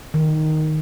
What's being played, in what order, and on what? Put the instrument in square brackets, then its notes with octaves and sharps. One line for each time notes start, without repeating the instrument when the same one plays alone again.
[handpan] D#3